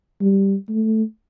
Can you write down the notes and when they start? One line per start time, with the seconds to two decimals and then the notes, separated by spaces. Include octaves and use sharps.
0.21 G3
0.69 A3